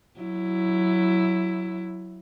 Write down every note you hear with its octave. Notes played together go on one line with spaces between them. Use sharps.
F#3 E4